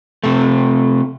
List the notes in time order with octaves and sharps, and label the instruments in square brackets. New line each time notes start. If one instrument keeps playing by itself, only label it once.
[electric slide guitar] C3 A3